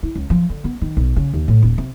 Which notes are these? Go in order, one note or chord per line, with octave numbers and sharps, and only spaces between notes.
E4
C#2
F3
D3
B3
D#3
B1
C#3
D#2
A2
D#1
C3